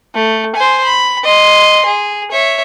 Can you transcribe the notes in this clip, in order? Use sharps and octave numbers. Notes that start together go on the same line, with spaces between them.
A3
C5 G#5
B5
D#5 C6
G#4
C#5 E5